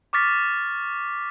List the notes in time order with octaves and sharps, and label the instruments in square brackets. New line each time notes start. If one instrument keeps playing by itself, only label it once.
[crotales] C#6 D6 F6 A6 B6